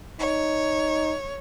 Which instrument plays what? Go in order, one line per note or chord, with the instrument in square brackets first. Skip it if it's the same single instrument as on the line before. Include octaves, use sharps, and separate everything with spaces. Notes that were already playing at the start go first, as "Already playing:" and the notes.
[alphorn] D#4 [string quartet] C#5